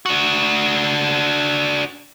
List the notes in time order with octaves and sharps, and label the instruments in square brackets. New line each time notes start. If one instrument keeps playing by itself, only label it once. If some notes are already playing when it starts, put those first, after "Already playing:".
[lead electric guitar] D4 F#4